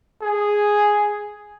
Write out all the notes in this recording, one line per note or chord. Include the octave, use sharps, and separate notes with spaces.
G#4